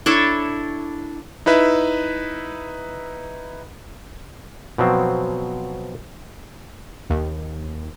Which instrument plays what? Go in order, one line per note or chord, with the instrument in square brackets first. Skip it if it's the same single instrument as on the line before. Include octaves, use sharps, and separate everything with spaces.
[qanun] D4 E4 A4 C#5
[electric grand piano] D#4 E4 B4 E5
[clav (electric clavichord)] B2 F3 F#3 C4
[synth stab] D#2